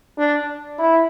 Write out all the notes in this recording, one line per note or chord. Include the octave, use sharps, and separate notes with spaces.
D4
E4